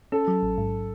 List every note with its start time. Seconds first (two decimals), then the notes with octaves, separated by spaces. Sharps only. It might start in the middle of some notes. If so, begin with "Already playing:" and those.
0.12 C#4 A4
0.28 F#3
0.43 A1
0.58 G#2